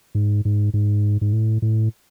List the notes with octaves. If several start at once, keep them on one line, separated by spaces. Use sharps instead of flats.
G#2
G#2
G#2
G#2
A2
A2